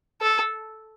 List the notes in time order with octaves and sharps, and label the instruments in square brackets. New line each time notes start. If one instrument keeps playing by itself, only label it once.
[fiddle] A4